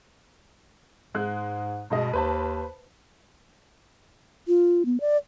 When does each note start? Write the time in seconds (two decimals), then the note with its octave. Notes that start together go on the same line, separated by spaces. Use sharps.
1.15 G#2 G#3 F#6
1.90 G2 B2 G#3 D#5
2.13 D#2 B4 C5 A5
4.48 F4
4.85 B3
5.00 D5